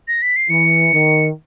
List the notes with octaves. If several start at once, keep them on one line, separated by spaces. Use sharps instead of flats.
A#6
B6
C7
E3 C#7
D#3